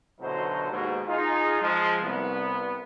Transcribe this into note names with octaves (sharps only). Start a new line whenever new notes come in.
A1 B2 D3 F#3 D#4 C5
D#2 G#2 B2
D#4 F4 G#4
F3 G#3
C2 B3